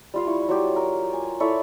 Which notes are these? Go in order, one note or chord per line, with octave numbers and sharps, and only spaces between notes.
G3 F4 F5
E4 C#6
F#3 F4 G4
A#4
G#5
E4 A4 C#5 D5